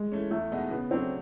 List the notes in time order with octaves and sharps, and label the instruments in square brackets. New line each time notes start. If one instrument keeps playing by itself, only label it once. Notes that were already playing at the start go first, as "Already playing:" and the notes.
Already playing: [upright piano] G#3
[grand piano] E3 A3 C#4
[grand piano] E2 [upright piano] A3
[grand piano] B2 G#3 B3 D#4
[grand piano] C#3 [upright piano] B3
[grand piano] F#3 A3 D4 [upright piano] C4